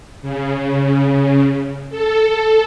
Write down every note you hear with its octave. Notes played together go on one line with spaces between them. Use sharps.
C#3
A4